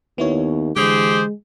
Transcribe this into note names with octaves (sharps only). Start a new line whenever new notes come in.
D#2 B3 E4 C#5
D3 E3 G#3 G4 G#4 C5